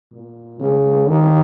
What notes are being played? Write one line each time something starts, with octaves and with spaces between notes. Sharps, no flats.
A#2
C#3
D#3